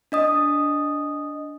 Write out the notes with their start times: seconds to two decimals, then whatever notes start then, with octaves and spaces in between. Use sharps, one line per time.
0.12 D4 D#5 D#6